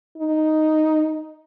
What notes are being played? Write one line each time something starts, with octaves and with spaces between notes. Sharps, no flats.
D#4